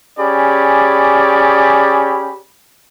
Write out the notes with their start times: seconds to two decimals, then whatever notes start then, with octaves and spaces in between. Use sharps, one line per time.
0.18 C#4 G4 G#4 D5 B5